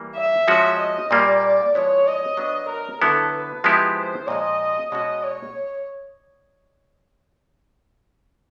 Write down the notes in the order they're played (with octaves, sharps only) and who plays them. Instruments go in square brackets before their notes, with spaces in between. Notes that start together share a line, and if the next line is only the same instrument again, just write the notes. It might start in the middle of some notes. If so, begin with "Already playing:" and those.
Already playing: [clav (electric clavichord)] E3 G3 A#3
[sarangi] E5
[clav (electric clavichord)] F3 G#3 C#4 F#4
[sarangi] D#5
[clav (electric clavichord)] A#2 G3 A#3 [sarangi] D5
[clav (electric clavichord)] F3 G#3 B3 E4 [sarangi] C#5
[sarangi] D#5
[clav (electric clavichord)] F#3 B3 D4
[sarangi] A#4
[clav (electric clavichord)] D3 F#3 B3 E4 [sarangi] A4
[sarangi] B4
[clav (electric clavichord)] F3 G#3 B3 E4 G4
[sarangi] C5
[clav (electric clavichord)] A#2 F3 G#3 [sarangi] D#5
[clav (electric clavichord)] B2 G#3 C#4 F#4 [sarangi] D#5
[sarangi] C#5